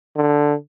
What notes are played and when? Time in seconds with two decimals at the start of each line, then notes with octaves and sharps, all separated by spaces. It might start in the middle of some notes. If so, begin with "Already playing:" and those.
0.16 D3